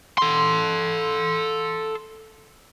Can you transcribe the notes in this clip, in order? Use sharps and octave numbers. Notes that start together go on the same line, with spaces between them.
A4 C6